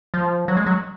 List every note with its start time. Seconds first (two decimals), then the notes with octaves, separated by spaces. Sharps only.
0.14 F3
0.48 F#3
0.57 G#3
0.66 F#3